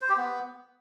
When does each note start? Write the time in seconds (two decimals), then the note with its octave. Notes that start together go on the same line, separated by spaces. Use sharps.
0.01 C5
0.09 G4
0.17 B3